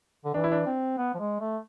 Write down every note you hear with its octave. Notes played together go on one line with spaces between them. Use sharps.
D3
E3 D4
E4
D4
C4
B3
F3
G#3
A3